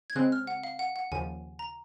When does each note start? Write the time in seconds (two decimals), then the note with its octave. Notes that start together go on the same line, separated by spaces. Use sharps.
0.10 G#6
0.15 C#3 G#3 C4 F#6
0.32 F6
0.47 F#5
0.63 F5
0.79 F#5
0.96 F#5
1.12 D#2 C#3 F3 G#5
1.59 A#5